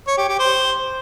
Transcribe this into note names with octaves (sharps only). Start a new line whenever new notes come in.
C#5
G4
G4
C5